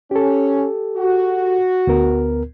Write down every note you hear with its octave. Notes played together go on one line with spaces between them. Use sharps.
C#4 G4 A4
F#4
D2 B3 A#4